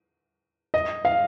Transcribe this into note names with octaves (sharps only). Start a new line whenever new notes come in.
D#5
F5